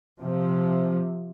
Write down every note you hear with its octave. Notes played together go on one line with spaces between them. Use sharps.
C3 F3